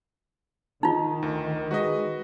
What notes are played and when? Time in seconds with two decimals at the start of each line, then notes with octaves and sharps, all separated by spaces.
0.83 D#3 D#4 F4
1.22 D2
1.71 G#3 F#4 B4 D#5